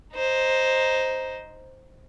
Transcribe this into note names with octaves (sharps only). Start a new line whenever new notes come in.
D#4 C5